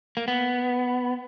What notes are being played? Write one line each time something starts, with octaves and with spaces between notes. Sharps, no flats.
A#3
B3